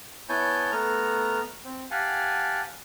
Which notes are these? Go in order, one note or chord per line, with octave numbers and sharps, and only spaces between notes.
B3 E4 C#5 G#5 A5 G6
A3 B3 A#5 F6
C4
G4 F5 F#5 G#5 A5